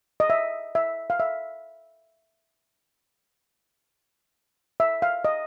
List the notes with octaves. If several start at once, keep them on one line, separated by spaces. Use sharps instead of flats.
D#5
E5
E5
F5
E5
E5
F5
D#5